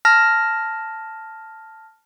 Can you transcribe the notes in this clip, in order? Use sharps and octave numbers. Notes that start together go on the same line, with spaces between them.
A5 F6 A#6